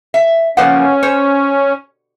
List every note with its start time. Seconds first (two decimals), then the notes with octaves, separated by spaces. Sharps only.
0.14 E5
0.57 C#3 F3 A#3 C#4 A#4 B4 F#5
1.03 C5 C#5